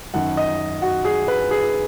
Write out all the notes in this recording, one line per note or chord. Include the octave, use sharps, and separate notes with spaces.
F#2 D#3 F#5
D#5
F#4
G#4
B4
G#4